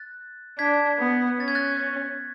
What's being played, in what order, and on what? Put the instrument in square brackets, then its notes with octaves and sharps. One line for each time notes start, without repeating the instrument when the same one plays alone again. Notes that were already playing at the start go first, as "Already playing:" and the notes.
Already playing: [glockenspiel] F#6 A6
[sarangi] D4 [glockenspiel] G#6 B6
[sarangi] B3
[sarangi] C#4 [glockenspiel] A6
[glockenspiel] G#6
F#6 A6